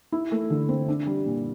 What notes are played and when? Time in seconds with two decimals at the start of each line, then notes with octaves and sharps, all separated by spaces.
0.12 E4
0.32 A3
0.50 D3
0.69 C4
0.89 D4
1.07 G3
1.26 A#2